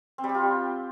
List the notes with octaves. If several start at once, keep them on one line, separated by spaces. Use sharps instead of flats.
C4
G3
G4
F4